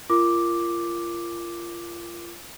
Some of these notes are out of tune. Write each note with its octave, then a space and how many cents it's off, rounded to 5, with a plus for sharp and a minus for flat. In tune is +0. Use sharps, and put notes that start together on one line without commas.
F4 -30 A#4 +0 D6 +0